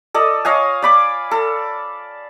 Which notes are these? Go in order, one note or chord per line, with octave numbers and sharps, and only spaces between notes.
A4 D5 D#5
C#5 D#5 F5 G#5
D5 B5 D6
A4